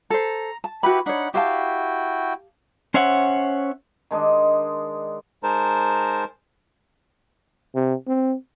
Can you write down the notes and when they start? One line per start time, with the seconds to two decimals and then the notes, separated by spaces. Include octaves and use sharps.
0.10 A4 C5 A#5
0.64 A5
0.83 E4 F#4 G4 B4 B5
1.06 D4 D#4 C#5 F#5 B5
1.34 E4 F#4 G4 F5 G5 A5
2.94 C#4 C5 C#5 E5 F#5
4.11 D#3 G#3 D4 D#5
5.43 G#3 D#4 A#4 C5 A5
7.75 C3
8.07 C4